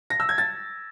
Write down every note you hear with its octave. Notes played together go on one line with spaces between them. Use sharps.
A#6
E6
G#6
A6